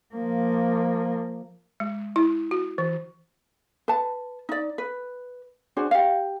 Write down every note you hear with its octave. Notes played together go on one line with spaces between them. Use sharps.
F3 A#3
G#3
E4
F#4
E3
B4 A5
D#4 D5
B4
D4 F#4 G#4 C5
G4 F5